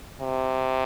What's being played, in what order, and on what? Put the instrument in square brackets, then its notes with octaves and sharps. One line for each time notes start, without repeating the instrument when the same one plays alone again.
[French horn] C3